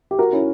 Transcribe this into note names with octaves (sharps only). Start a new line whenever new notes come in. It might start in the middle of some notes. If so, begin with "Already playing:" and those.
G4
F#4 A#4
C#4 E4